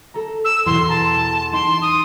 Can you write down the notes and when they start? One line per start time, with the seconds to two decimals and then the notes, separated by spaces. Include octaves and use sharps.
0.14 A4 A#5
0.44 E6
0.66 E2 B2 C6
0.88 A5 A#5 C6
1.52 D#4 C6 D7
1.81 D#6